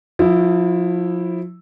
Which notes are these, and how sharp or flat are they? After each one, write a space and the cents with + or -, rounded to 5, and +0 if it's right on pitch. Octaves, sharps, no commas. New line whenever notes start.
F3 +30 E4 +0